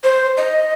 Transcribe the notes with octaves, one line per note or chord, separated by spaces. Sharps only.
C5
D#5